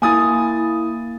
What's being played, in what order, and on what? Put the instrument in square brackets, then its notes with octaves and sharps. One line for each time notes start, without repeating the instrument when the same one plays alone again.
[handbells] A#3 E4 [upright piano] G#5 D#6 A6